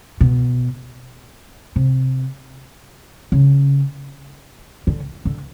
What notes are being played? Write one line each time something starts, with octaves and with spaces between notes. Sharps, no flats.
B2
C3
C#3
D3
D3